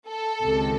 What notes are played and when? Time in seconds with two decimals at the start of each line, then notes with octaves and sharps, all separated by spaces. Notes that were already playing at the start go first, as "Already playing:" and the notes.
0.08 A4
0.44 C#2 C3 D#3